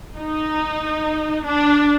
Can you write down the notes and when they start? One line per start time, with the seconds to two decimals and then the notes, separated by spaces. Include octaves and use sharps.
0.18 D#4
1.47 D4